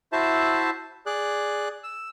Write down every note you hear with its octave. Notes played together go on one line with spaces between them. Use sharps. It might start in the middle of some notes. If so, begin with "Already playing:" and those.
E4 F#4 C5 E5 A5
G#4 D5 F#6
E6